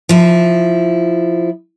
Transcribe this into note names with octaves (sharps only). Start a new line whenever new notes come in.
F3 E4